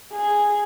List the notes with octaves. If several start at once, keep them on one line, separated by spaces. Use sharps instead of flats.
G#4